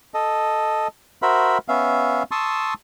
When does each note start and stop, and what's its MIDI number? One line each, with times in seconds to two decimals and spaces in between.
0.14 0.88 69
0.14 0.88 75
1.22 1.58 66
1.22 1.58 70
1.22 1.58 72
1.22 1.58 76
1.22 1.58 83
1.68 2.23 59
1.68 2.23 61
1.68 2.23 76
1.68 2.23 77
2.31 2.74 81
2.31 2.74 84
2.31 2.74 85
2.31 2.74 87
2.31 2.74 88